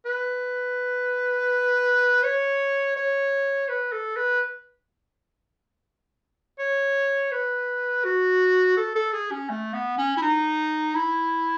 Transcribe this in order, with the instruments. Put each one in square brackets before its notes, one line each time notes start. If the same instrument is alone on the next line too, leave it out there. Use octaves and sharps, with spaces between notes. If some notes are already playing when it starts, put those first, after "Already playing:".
[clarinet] B4
C#5
C#5
B4
A4
B4
C#5
B4
F#4
A4
A4
G#4
C#4
A3
B3
C#4
E4
D#4
E4